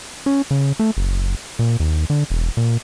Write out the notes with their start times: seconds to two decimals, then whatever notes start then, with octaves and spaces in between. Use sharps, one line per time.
0.26 C#4
0.51 C#3
0.79 A3
0.97 F#1
1.59 A#2
1.80 D#2
2.10 D3
2.30 E1
2.57 A#2